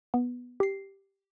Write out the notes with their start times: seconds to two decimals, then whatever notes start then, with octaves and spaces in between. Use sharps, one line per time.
0.14 B3
0.60 G4 C7